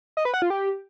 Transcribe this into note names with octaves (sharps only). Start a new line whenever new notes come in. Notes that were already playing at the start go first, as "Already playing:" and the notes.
D#5
B4
F#5
F4
G4